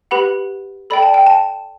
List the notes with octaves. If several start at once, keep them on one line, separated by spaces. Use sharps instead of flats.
G4 B4 F#5 B5
A4 D5 G5 B5
A5
G5
A5